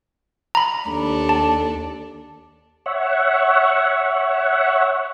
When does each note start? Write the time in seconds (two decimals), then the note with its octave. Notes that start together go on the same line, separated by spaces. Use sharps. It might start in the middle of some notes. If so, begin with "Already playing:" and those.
0.55 A#5 B5
0.88 D#2 D4 A4
1.29 A5
2.86 C#5 E5 F#5